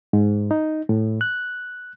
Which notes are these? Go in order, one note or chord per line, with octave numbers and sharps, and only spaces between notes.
G#2
D#4
A2
F#6